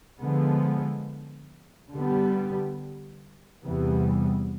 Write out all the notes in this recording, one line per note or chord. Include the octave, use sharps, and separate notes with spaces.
D3 F3 G#3 B3
D3 G3 B3
E2 C3 E3 G3 B3